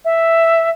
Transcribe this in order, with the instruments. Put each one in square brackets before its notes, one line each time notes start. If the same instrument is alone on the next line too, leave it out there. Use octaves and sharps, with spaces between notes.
[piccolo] E5